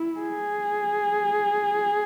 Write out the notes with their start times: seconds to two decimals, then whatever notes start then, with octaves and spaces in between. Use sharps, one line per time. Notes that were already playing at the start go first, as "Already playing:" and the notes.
Already playing: E4
0.20 G#4